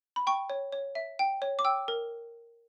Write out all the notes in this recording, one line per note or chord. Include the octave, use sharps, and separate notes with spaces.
B5
G5 C#6
C#5
C#5
E5
G5
C#5
D6
G5 E6
A#4